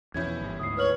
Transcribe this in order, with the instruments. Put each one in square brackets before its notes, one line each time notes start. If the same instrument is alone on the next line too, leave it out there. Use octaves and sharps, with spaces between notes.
[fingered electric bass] E2 B2 F3 [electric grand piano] B3 C#4 E4 [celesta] G6 G#6
[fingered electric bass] G1 E3
[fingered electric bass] D2 G#2 [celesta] D#6 C7
[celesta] B4 F6 F#7 [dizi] C#5